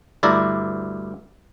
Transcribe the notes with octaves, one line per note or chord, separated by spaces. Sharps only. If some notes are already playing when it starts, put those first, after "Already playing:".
D2 G2 E4 D5 A#5